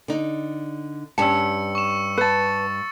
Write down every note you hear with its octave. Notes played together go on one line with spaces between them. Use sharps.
D3 D#4
G2 G3 C#4 A5 E6 C#7
C#6 E7
B4 A5 A6 C#7